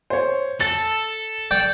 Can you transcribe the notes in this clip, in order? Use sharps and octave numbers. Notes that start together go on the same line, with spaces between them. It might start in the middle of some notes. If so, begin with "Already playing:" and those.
C5 C#5
A4 A6
D5 G5